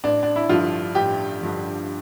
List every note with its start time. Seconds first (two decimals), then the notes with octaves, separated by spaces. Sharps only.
0.04 A1 D4
0.23 D4
0.36 E4
0.49 G2 D3 F3 F4
0.95 A1 G4
1.41 G2 D3 F3